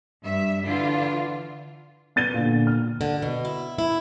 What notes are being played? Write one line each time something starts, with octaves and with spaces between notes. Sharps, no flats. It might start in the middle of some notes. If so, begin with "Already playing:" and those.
G2 E5
D3 E3 F4
B3 A6 D#7 G7
A#2 D3
F6
D3
B2
E4
E4